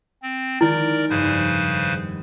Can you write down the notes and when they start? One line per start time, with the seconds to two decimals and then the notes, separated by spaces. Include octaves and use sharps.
0.22 C4
0.61 D#3 G#3 E4 A#4 D5
1.10 F1 G2 C#3 B4 C5 G#5